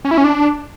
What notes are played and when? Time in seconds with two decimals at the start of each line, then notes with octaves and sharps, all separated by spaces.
0.05 C#4
0.11 E4
0.18 C#4
0.24 D4